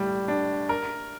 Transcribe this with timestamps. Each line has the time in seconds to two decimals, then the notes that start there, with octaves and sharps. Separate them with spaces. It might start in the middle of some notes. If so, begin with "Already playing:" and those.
Already playing: A2 G3
0.28 D4
0.69 A#4